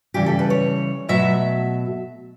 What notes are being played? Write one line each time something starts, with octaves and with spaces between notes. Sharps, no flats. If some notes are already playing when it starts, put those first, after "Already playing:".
C#3 E3 G3 G4
A4
B4
C#5
B2 F#3 A3 E5